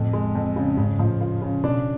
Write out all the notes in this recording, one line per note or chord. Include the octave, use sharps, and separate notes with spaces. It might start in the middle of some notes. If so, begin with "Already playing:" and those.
Already playing: F2 A2
G#3
F2
C#3
G#2 C#3
A2 F3
F4
C#3
B2 D4